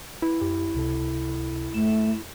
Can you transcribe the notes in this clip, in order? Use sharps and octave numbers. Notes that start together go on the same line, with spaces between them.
E4 B4
F#2 G4
C#2 C3 A4
F2 A3 E7